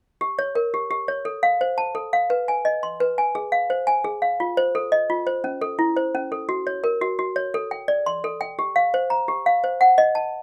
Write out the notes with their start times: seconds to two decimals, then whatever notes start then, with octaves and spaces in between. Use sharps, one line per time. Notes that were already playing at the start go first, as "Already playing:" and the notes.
0.21 G4
0.39 C#5
0.55 A#4
0.74 G4
0.91 G4
1.08 C#5
1.25 A4
1.43 F5
1.61 C5
1.78 A5
1.95 A4
2.13 F5
2.30 B4
2.48 G#5
2.65 D#5
2.83 C6
3.00 B4
3.18 G#5
3.35 G#4
3.52 F5
3.70 C5
3.87 G#5
4.04 G#4
4.22 F5
4.40 F4
4.57 C5
4.75 A4
4.92 D#5
5.10 F4
5.27 C5
5.44 C#4
5.61 A4
5.79 E4
5.97 C5
6.15 C#4
6.32 A4
6.49 F#4
6.67 C#5
6.84 A#4
7.01 F#4
7.19 F#4
7.36 C#5
7.54 A4
7.71 G5
7.88 D5
8.06 C6
8.24 A4
8.41 G5
8.59 G4
8.76 F5
8.94 C5
9.10 A#5
9.28 G4
9.46 F5
9.64 C5
9.81 F#5
9.98 D#5
10.15 A5